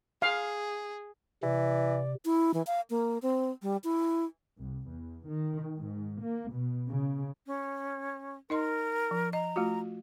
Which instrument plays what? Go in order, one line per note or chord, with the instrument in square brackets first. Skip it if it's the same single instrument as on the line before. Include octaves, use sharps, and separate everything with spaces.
[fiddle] G#4 [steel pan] F5
[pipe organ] C3 [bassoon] E3 [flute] D5
[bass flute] E4
E3
F5
A#3
C4
G3
E4
[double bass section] C2
E2
D#3
G#2
A#3
B2
C#3
[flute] C#4
[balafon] D#4 D#5 C6 [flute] A#4
[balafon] F3
[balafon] D#5 [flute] A#5
[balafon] A3 F4 F#4